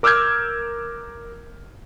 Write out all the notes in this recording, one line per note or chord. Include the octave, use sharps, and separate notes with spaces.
A#4 D6 E6 F6 G6 G#6